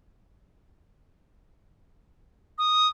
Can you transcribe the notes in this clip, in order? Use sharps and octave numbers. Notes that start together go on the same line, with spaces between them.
D#6